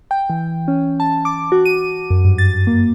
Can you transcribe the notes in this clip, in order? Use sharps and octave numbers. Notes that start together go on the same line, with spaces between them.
G5
E3
C#4
A5
D6
F#4
D#7
F#2
G2
A6
A#3